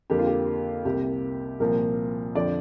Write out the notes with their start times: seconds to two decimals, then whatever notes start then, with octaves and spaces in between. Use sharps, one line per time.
0.10 F2 D3 A#3 G4
0.19 F4
0.27 G4
0.85 C2 C3 A#3 G4
1.60 C2 A#2 F3 A#3 A#4
2.35 F2 D3 F3 D5